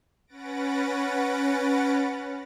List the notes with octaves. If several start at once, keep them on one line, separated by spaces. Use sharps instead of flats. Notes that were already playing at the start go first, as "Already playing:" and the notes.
C#4 B4 F#5 A6 A#6 D7